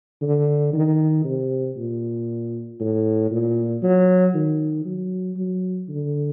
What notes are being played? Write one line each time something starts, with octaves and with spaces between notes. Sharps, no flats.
D3
D#3
C3
A#2
A2
A#2
F#3
D#3
F#3
F#3
D3